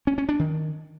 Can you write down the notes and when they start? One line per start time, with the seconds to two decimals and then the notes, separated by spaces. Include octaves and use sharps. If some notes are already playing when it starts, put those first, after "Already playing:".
0.07 C#4
0.18 C#4
0.29 D4
0.39 D#3